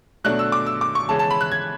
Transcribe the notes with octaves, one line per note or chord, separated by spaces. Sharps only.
B2 F#3 A3 D4 F#6
E6
D6
E6
D6
C#6
C#3 E3 G#3 C#4 A5
A5
B5
F#6
G#6